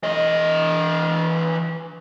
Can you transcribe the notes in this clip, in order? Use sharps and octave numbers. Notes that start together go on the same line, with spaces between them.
E3 D#5